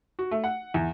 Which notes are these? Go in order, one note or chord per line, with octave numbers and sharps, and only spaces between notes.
F#4
A3
F#5
E2